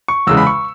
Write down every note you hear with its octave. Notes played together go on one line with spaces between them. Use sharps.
C#6
E2 C#3 G#3 E6
B5
C#6